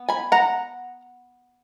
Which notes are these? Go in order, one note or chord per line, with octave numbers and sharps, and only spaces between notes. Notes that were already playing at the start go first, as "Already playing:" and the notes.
Already playing: B3
G#5 B5
F#5 A#5